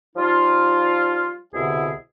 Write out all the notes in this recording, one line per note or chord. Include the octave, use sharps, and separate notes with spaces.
F3 G3 D#4 F4
C2 B2 D3 E4 G#4